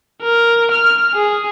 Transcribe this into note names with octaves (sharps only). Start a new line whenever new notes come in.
A#4
F6
G#4